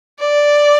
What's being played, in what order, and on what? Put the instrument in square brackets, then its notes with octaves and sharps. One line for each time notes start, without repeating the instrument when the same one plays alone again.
[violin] D5